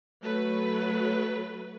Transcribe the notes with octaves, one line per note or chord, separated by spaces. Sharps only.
F#3 A3 B4